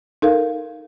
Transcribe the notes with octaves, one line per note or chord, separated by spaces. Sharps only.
D#4 A4 A#4 F5